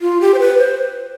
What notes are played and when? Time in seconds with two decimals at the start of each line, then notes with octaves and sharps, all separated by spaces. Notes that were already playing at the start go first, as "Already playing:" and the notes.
0.01 F4
0.21 G4
0.34 C5
0.39 B4
0.58 C5